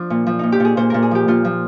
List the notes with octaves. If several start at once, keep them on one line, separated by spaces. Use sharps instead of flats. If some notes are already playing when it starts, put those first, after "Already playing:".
Already playing: F3 D4
A#2
F3
A#2 D#4
G4
A#2 G#4
A#2 C5
A#2 A#4
G#4
F3 G4
A#2 F4
F3